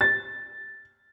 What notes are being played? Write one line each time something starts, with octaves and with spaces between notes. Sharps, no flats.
A6